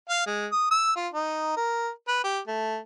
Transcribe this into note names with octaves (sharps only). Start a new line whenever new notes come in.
F5
G#3
D#6
E6
F4
D#4
A#4
B4
G4
A3